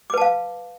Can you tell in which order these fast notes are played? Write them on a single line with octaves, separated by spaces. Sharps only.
D6 B4 A5 F5